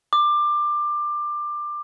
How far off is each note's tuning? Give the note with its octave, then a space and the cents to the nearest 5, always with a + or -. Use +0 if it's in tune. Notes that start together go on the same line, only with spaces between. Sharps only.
D6 +20